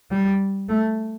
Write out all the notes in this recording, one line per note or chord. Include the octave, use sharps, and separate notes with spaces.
G3
A3